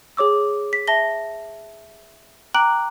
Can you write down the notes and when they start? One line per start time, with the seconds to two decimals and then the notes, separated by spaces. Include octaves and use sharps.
0.17 G#4 C#5 D6 E6
0.73 B6
0.88 E5 A5 A#6 G7
2.54 G5 A#5 D6 F#6 D7 F#7